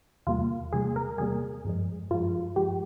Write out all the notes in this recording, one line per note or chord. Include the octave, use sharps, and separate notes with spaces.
E2 C3 G3 A#3 F4
E2 C3 G3 A#3 G#4
A#4
E2 C3 G3 A#3 G#4
G2 F3 G#3
G2 F3 G#3 F4
G2 F3 G#3 G4